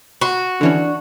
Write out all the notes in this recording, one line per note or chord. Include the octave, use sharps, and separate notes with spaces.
F#4 B5 C6
D3 E3 C#4 D4